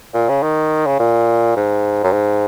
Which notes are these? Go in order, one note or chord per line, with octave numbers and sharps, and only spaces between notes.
A#2
C#3
D#3
C#3
A#2
G#2
F#2
G#2